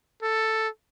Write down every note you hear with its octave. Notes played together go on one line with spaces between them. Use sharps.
A4